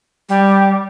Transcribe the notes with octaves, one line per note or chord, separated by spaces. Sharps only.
G3